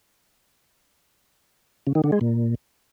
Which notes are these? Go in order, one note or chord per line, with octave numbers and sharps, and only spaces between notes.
C#3
D#3
D3
G#3
A#2